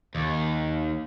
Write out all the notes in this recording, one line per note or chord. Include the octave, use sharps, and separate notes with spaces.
D#2